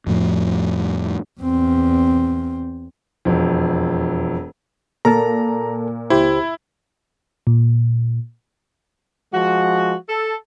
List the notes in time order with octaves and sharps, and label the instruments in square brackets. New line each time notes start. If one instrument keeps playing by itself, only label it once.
[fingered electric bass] F2 A2 F3
[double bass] E2 C4
[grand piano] E1 F2
[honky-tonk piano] A#2 [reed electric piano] A4 A#4 A5 [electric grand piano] A#5
[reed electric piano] C#2 G4 C5 [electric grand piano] E4
[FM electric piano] A#2
[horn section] F3 G#3 F#4
A4